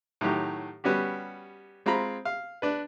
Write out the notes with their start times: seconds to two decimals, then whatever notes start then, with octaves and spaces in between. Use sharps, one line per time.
0.21 A2 D#3 F#3 G4
0.84 G3 B3 C#4 F#4 G4
1.86 G#3 C4 F4 A#5 B5
2.25 F5
2.62 D4 B4